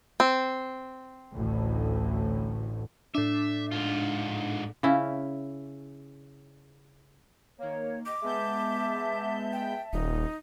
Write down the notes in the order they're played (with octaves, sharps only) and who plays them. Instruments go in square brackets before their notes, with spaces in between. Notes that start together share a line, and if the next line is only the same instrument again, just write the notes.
[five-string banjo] C4
[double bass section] A1 D2 A2
[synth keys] A2 D4 [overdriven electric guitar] E5
[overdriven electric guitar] G#2 F4
[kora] C#3 C#4 E4
[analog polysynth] D#3 A#3 [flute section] C#5
[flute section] D#5 [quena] D6
[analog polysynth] G#3 B3 G6 [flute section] E5 A5
[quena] G5
[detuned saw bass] D#1 [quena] D#4